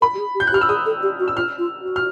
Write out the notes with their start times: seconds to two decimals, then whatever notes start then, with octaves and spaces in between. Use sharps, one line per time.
0.01 A#4 B5
0.14 G4
0.18 G#4
0.35 G4
0.40 G6
0.47 F#6
0.52 G4 F6
0.61 E6
0.68 G#4 D#6
0.86 A4
1.02 G4
1.19 F#4
1.28 E6
1.37 F4 F6
1.58 F4
1.81 F#4
1.96 F6